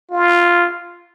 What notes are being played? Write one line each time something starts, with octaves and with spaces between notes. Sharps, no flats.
F4